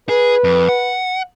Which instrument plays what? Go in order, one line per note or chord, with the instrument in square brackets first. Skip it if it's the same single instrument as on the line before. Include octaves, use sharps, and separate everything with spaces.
[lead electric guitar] G#4 [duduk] B4
[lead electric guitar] F2
F#5